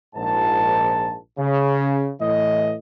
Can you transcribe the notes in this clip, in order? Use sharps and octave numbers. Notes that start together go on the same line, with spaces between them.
A#1 G#2 A5
C#3
A2 E3 D#5